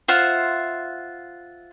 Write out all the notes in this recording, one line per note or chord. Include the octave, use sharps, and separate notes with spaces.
F4 C5 E5 F#5